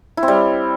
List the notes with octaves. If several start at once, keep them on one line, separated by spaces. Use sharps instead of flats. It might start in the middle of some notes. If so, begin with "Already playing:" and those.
E4
C4
G3